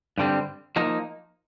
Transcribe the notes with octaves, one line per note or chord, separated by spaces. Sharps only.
G2 D3 G3 C4
F3 A#3 D#4